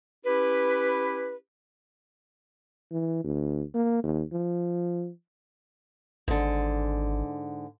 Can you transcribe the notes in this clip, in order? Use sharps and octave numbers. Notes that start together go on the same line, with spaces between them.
C#4 E4 G4 B4
E3
D2
A#3
D#2
F3
G#1 G#2 D3